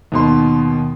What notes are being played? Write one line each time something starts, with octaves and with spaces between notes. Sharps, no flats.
D#2 B2 C6